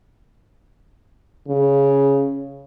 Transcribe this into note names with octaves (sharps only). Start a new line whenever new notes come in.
C#3